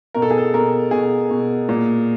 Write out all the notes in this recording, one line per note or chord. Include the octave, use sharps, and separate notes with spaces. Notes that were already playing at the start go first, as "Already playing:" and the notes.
B2 A#4
A4
G#4
A4
B2 A#4
B2 G#4
B2
A#2